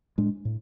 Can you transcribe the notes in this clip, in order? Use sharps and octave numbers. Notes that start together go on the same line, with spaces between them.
A2 G#3 D4
A2